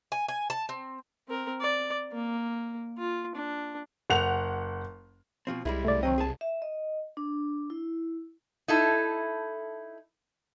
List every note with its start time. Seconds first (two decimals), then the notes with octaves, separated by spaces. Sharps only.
0.12 G#5
0.29 G#5
0.50 A5
0.69 C4
1.28 C4 A#4
1.61 D5
2.13 A#3
2.98 F4
3.35 D4
4.10 F#1 F#5 F7
5.47 B2 F3 C4
5.65 C2 G3 G#3 E4
5.85 A3 D5
6.03 D#3 F#3 C4 D#5
6.18 G#4 A5
6.41 E5
6.62 D#5
7.17 D4
7.70 E4
8.68 D#4 E4 A4